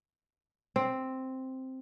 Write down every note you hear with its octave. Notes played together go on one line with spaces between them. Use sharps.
C4